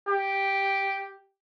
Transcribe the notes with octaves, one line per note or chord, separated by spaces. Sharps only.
G4